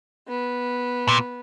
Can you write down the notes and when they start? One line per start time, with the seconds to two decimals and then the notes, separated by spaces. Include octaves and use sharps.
0.28 B3
1.08 A#2